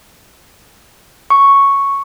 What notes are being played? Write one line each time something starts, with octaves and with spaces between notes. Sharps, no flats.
C#6